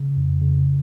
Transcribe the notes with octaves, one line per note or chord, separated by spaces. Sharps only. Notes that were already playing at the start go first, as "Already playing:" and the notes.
Already playing: C#3
F2
C#3